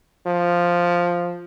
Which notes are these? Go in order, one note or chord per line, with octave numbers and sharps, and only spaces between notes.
F3